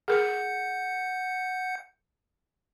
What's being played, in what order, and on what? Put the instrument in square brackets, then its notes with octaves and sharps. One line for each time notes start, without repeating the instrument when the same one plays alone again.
[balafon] G#4 A#4 [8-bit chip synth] F#5 G6 C#7